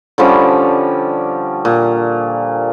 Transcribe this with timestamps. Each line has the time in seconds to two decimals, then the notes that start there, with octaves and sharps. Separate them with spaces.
0.18 D3 F3 G3 C#4
1.65 A#2